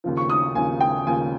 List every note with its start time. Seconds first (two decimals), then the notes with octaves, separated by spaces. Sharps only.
0.04 D#2 C#3 F3
0.17 C#6
0.30 D#6
0.55 D#2 C#3 F3 G#5
0.81 G5
1.07 D#2 C#3 F3 G#5